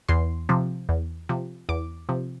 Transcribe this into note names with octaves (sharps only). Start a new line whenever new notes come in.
E2 C6
C3 F3
E2
C3 F3
E2 D6
C3 F3